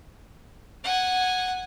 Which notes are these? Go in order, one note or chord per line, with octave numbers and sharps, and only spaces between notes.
F#5 G#5